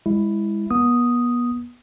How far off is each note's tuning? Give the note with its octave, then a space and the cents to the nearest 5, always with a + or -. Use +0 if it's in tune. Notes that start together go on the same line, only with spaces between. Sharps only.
G#3 -25 E4 +0
B3 -35 D#6 +0